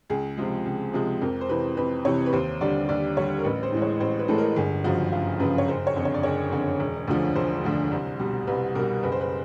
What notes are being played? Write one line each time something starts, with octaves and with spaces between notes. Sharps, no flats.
C#2 G#4
C3 F3 G#3
C#2
C3 F3 G#3
F2 A#4
C5
C3 E3 B4
F2 B4
C3 E3 C#5
B4
D#2 C5
D3 G3 D5
D#2 D5
D3 G3 C#5
A#4
A1 B4
C5
A2 E3 G#3
C#5
A1 C5
B4
A2 E3 G#3 A4
A#4
G1 G#4
F#2 C#3 F3 F#4
G1 F4
F#2 C#3 F3 B4
C#5
F#1 C5
C#5
F2 D3
C#5
D5
F#1 C#5
F2 D3
E1
D2 D3 F3
E1 C5
D2 D3 F3
C2
B2 G3
C2 B4
B2 G3 A#4
F#1 B4
C5
B4